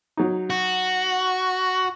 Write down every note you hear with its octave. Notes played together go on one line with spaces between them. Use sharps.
F#3 D#4
F#4